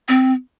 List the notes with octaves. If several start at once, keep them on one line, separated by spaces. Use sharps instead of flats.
C4